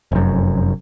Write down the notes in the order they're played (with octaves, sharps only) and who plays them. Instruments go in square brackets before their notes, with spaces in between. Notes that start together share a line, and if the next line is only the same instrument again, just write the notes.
[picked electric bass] F1 F#2